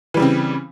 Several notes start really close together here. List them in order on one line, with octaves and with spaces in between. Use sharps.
E3 G3 C#3 C4